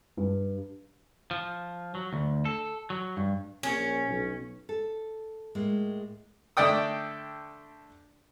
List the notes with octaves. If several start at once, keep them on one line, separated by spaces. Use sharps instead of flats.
G2
F3
F#3
D2
A4
F#3
G2
A#1 C#4
B1
A4
A2 G#3 A#3
D3 A3 D5 G5 D#6